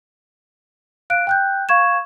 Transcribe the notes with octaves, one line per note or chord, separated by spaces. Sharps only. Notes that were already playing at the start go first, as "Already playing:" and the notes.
F5 F#6 D7
G5 F#6 G6
F5 C#6 G#6 E7